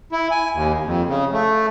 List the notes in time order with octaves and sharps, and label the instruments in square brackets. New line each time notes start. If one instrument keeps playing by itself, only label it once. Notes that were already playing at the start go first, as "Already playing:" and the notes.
[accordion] E4
G#5
D#2
F2
C#3
A3